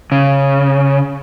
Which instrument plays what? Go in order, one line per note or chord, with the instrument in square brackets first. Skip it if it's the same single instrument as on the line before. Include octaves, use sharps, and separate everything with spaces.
[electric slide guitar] C#3